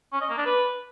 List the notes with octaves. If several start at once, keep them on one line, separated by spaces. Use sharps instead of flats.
C#4
D#5
A#3
D4
B4